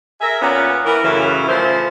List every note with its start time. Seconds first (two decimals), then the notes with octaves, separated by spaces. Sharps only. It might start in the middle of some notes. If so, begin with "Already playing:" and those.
0.21 G#4 A#4 E5
0.42 A#2 A#3 B3 C#4
0.84 E3 A#4
1.04 F#2 A2 C#3 E3
1.48 C#3 F3 A3 A#4 C5